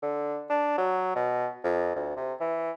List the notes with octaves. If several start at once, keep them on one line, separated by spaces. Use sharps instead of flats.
D3
D4
F#3
B2
F2
D2
C3
E3